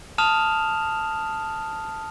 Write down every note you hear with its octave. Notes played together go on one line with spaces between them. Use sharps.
A5 D#6 F6 E7 F7